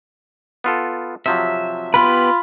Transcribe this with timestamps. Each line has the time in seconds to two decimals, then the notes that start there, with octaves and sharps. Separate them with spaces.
0.64 B3 F4 A4
1.26 C3 F3 F#3 E5
1.94 B3 F4 G4 B4 B5